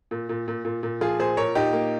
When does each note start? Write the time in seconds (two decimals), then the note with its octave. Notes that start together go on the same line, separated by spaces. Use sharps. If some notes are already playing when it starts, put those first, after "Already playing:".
0.11 A#2
0.29 A#2
0.48 A#2
0.65 A#2
0.83 A#2
1.01 F3 F4 G#4
1.19 A#2 G#4 C5
1.37 A#2 A#4 C#5
1.55 A#2 D#4 G4
1.73 A#3